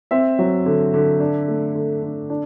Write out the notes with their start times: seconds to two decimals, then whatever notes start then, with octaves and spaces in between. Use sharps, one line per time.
0.11 C4 E5
0.39 F#3
0.66 D3
0.94 D3
1.20 D4
1.48 A3
1.75 D3
2.02 D3
2.30 D4